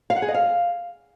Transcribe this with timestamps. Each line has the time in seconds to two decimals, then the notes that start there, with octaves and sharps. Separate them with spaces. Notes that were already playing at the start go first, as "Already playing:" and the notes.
0.10 F5
0.16 F#5
0.22 G#4
0.28 D#5
0.34 F5